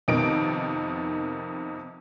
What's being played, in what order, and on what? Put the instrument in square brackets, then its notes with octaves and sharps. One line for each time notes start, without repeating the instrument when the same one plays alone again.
[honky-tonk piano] F2 C3 D#3 B3 D#4 D7